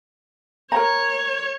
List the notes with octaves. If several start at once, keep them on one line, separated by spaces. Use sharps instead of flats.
A#4 C#5 A#5